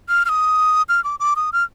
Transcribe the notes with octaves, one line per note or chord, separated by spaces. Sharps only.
F6
F6
D#6
F6
D6
D6
D#6
F6